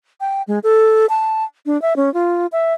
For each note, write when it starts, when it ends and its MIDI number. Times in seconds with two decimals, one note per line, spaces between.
0.21 0.42 79
0.48 0.59 56
0.63 1.06 69
1.09 1.44 81
1.66 1.80 62
1.82 1.96 76
1.96 2.12 61
2.14 2.47 65
2.52 2.74 76